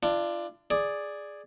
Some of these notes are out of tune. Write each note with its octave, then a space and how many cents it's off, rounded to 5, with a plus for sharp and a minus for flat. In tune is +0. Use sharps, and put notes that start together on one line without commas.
D4 +15 F4 -30
G#4 +0 D5 +0